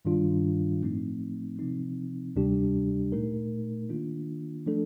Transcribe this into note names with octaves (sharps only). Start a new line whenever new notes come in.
G2 D#3 G3 D4 F4
A2 F3 A3 C4 D#4
C3 F3 C4 D#4
D2 C3 G3 D4 G4
A#2 A3 D#4 A#4
D#3 A#3 D4 F4
F3 A3 D4 A4